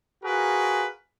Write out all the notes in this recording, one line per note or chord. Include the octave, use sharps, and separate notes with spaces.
F4 F#4 G#4 A#4 B4